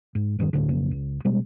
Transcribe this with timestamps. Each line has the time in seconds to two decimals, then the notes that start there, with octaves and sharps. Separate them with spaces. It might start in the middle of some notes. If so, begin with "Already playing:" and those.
0.15 G#2
0.39 E2 G2 C3 D#3
0.53 G1 D2 A2 D3
0.69 B1 F2 C#3 A#3
0.91 C#2
1.25 B2 G3 G#3